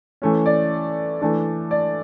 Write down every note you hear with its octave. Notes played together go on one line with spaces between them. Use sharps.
E3 A3 C#4
D5
E3 A3 D4
D5